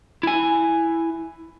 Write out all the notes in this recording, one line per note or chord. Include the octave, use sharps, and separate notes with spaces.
E4 G#5